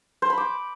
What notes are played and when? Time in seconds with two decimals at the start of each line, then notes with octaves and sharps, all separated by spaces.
0.22 C5
0.30 B5
0.38 D6